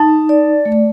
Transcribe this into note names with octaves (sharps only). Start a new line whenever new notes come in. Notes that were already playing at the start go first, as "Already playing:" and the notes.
Already playing: D#4 A5
D5
A3